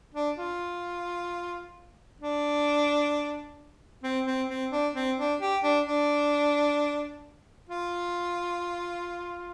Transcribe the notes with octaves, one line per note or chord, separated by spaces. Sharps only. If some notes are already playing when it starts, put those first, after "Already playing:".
D4
F4
D4
C4
C4
C4
D4
C4
D4
G4
D4
D4
F4